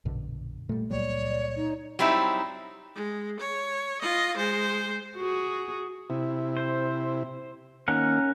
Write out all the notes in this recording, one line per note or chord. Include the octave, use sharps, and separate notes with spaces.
A#1 F#2 B2 D3
A#2 G3 A3
C#2 A#2 F#3 G3 C#5 D5
D#4
F#3 G3 C4 D#4 E4
G#3
C#5
F4 D#5
G#3 C5
F#4 G#4
C3 E4
C5
D#3 A#3 C#4 A#4 F#5